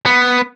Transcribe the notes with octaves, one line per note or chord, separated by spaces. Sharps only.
B3